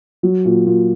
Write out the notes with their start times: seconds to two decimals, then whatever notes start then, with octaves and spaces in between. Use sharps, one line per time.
0.23 F#3
0.45 A#2
0.66 A#2